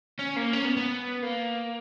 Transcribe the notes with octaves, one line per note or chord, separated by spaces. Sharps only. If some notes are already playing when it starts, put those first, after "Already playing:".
C#4
A#3
C#4
B3
B3
A#3